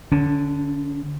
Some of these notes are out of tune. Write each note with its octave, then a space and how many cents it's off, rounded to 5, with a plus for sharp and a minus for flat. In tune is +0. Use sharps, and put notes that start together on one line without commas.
D3 +0 C#4 +35